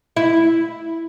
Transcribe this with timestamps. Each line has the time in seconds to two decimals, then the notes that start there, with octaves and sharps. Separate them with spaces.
0.16 E4